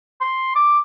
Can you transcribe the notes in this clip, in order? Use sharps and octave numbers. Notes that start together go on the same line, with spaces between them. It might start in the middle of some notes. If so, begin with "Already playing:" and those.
C6
D6